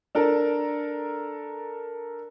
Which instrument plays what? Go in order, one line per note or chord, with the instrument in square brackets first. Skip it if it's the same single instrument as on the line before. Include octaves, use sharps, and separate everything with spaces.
[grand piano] D4 A4 A#4